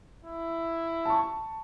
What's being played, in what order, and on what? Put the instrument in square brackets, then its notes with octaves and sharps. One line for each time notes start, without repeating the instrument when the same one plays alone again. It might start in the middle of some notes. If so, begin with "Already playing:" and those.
[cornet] E4
[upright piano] A5 C#6